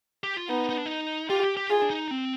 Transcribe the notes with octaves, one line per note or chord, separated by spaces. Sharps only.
G4
F4
B3 D#4
D#4
D4
D#4
F4 G4
G4
G4
F4 G#4
D4
D#4
C4